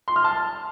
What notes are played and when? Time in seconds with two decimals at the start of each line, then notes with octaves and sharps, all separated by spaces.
0.08 C6
0.16 F6
0.24 A5